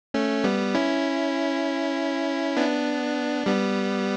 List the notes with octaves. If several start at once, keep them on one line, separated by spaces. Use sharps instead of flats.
A3 C#4
G3 B3
C#4 E4
B3 D4
G3 B3